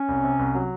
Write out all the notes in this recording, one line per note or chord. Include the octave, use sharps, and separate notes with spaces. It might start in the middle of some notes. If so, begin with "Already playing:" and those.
Already playing: C#4
C2
C3
C2
F#3